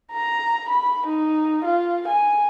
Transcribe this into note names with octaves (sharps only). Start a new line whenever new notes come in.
A#5
B5
D#4
F4
G#5